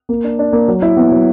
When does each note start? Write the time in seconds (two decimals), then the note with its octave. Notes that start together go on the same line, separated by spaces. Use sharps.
0.09 A#3
0.24 D4
0.39 D4
0.53 A#3
0.68 F#3
0.82 E4
0.97 B3
1.11 F#3